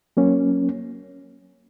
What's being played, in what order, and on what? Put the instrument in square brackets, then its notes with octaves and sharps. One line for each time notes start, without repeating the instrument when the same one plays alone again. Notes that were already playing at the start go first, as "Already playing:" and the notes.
[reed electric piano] F#3 A#3 C#4